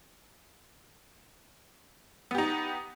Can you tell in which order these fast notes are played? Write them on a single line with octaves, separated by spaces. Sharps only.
B3 G4 D#4